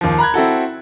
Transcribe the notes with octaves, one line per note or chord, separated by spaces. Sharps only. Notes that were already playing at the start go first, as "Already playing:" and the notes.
D#2 F3
A#5 B5 F#6 G#6
C4 E4 F#4 A4